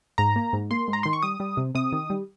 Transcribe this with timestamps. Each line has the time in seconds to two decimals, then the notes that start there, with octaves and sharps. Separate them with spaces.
0.18 G#2 A#5
0.36 A#3
0.53 G#2
0.71 A#3 C6
0.88 G#2
0.93 A#5
1.03 D#3 C6
1.13 C#6
1.22 G3 D#6
1.40 G3
1.57 C3
1.75 C3 D#6
1.92 D#3
2.10 G3